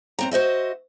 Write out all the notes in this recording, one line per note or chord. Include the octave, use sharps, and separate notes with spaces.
F#2 C4 A#5
F#4 C5 D#5 E5